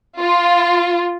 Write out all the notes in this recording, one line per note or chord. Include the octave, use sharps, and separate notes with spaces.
F4